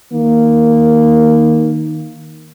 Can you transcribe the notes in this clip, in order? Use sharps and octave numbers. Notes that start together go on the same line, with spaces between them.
D#3 A#3